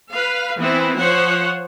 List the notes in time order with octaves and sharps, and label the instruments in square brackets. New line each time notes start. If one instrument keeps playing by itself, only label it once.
[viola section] B4 F5
E3 B3 C4 E4
F3 C5 C#5 F#5